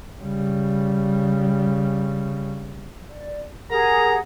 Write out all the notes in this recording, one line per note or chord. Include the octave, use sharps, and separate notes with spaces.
C#3 G3
D5
G4 G#4 A#4 F#5 A#5